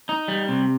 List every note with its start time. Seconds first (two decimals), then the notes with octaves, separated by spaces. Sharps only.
0.09 D#4
0.28 G3
0.48 C3